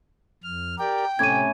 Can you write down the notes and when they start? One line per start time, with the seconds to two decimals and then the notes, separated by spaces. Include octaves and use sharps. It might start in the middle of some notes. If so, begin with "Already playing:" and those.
0.43 F2 F6
0.79 G4 A#4 D5 G5
1.19 A2 C3 C#4 D6 G#6 D#7